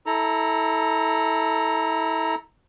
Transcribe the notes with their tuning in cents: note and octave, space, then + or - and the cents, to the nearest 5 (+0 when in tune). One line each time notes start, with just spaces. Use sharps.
E4 -25 A4 +0 A#5 +0